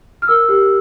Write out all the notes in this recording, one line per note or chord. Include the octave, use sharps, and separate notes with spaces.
F6
A#4 E6
G4